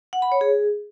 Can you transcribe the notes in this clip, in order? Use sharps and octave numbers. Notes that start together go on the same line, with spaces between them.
F#5
B5
C#5
G#4